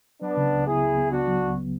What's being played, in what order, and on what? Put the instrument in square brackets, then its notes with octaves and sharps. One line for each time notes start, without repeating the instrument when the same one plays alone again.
[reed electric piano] F#3 [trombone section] B3 D4
[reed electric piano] C#3
C#2
[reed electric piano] B3 [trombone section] E4 G#4
[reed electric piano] C#2
B3
[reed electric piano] B3 [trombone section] D4 F#4
[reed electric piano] F#3
C#2
B3